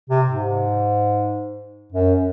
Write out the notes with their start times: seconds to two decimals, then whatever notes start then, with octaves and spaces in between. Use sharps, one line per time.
0.10 C3
0.29 G#2
1.92 F#2